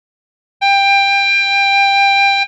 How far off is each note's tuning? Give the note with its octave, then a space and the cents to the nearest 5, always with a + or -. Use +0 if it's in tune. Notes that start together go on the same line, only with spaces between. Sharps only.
G5 +20